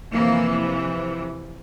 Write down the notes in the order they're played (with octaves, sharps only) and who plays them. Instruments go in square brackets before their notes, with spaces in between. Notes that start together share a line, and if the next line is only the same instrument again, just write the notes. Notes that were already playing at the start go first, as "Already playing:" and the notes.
[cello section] F2 C3 E3 A#3